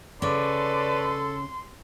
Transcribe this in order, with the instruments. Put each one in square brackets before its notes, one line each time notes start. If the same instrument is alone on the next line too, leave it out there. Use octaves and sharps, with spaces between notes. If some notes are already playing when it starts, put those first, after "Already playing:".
[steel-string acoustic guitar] C#3 C#4 [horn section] A4 [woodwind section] B4 C#5 D5 [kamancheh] C6